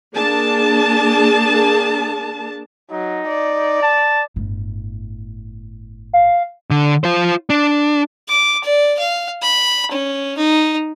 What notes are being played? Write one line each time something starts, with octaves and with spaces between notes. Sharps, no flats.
A#3 D4 G#4 A5
F#3 D#4
D5
A5
G1 A2
F5
D3
F4 C5
D4
D6
D5
F5
B5
C#4
D#4